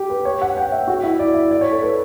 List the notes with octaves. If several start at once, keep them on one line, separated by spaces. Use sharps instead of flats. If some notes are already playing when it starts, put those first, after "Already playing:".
Already playing: G4
B4
C#5
F#5
G5
E5
F#4
E4
D5
E5
D5
C#5
A4
B4